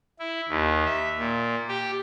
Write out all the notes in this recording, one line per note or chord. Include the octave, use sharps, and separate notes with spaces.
E4
D#2
E5
A#2
G4